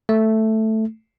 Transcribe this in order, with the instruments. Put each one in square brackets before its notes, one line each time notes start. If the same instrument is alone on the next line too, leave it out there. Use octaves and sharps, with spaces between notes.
[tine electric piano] A3